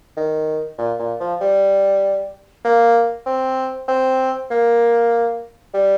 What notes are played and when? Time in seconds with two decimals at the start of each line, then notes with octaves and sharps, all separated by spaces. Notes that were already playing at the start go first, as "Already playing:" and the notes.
0.17 D#3
0.78 A#2
0.99 A#2
1.20 F3
1.41 G3
2.65 A#3
3.26 C4
3.88 C4
4.51 A#3
5.74 G3